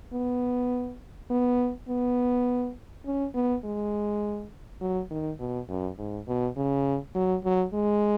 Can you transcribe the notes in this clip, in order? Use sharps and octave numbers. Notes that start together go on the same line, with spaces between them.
B3
B3
B3
C#4
B3
G#3
F#3
D#3
B2
F#2
G#2
B2
C#3
F#3
F#3
G#3